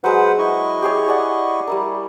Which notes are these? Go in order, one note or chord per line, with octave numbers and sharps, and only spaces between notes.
F#3 G#3 F#4 B4 C5 F#5
E4 D#5 C#6
G4 G#4 C#5
G#4 D5 F#5
G3 E4 A#4